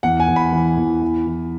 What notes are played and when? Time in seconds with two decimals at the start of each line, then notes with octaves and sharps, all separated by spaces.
0.03 E2 F#5
0.20 G#5
0.28 E2
0.36 B5
0.53 E3
0.77 E2
1.02 E3
1.26 E3